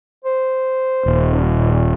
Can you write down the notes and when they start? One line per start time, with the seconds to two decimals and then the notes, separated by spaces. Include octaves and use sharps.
0.25 C5
1.06 D#1
1.55 A#2